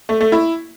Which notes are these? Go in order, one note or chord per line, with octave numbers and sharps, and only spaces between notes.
A3
A3
E4